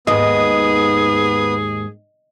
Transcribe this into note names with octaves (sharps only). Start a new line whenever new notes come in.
D#2 G#2 B3 G#4 D#5 D#6